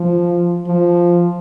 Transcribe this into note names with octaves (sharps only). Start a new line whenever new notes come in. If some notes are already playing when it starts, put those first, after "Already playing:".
Already playing: F3
F3